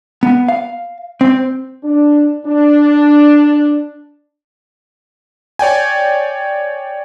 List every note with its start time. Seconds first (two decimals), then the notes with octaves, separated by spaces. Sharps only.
0.23 B3
0.48 F5
1.21 C4
1.84 D4
2.46 D4
5.59 C#5 D5 G5 G#5